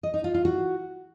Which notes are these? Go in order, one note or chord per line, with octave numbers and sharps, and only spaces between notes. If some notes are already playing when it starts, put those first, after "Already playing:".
D#5
D#4
F4
F4
F#4